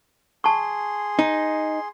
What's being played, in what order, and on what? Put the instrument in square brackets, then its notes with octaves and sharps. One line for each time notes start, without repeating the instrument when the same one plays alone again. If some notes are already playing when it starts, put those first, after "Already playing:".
[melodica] G#4 C6 [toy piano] A5 C#6
[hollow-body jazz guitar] D#4